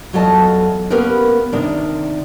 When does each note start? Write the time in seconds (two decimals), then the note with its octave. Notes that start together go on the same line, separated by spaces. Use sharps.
0.13 E2 F#3 F4 A4 D#5 A5
0.90 A#3 B3 C#4 G4 A#4 B4
1.52 C3 D#3 D4